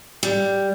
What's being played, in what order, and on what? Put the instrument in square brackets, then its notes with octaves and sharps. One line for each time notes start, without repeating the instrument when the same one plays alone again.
[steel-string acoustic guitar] G3